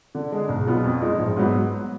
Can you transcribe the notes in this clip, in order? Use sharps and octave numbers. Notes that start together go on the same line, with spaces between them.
D3
G#3 D4 G#4
B1
B2 F#3 B3 F4
F2
F3 G#3 D#4
A#1
G#2 F#3 B3